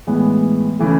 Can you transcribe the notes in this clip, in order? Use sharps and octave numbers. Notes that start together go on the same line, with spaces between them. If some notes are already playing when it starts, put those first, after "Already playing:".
A2 E3 G#3 B3
C#3 E3 A3